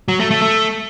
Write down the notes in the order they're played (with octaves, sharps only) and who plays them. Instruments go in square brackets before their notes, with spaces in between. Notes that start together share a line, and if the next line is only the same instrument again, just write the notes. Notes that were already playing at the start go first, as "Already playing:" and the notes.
[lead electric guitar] F#3
A3
A3
A3